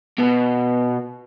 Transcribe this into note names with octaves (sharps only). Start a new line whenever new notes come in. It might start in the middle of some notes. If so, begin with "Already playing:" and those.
B2